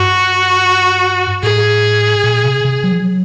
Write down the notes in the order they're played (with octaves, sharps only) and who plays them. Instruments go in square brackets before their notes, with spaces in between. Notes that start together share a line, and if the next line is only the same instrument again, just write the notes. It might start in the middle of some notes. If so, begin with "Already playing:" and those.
Already playing: [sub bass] G2 [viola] F#4
[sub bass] A2 [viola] G#4
[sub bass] A#2
C3
C3
F#3
F3
F#3